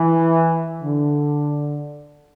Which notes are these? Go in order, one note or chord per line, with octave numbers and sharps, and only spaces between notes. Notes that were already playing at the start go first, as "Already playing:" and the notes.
Already playing: E3
D3